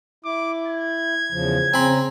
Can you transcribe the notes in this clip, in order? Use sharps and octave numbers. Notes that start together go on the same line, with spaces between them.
E4 D6
G#6
E2 C#3 F3
C#3 C4 G#5 A#5 B5